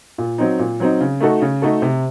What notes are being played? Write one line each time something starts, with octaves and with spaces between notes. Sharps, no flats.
A#2
F#3 C4 D#4
A#2
F#3 C4 D#4
C#3
A3 D#4 F#4 A4
C#3
A3 D#4 F#4 A4
C3